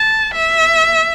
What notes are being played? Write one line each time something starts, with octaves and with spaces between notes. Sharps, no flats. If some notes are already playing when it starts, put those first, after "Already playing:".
Already playing: A5
E5